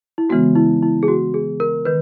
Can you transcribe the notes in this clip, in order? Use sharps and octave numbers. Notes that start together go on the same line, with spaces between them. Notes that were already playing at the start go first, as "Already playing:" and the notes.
E4
C#3 E3 G#3 B3 F#4
E4
E4
G#4
F#4
G#4
A#4
D#3 B4